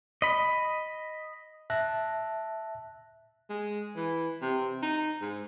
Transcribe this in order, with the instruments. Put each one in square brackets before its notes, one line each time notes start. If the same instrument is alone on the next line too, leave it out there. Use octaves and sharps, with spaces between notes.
[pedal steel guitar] D#5 B5
[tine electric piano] E5 A5 F#6 A#6
[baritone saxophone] G#3
E3
C3
D#4
G#2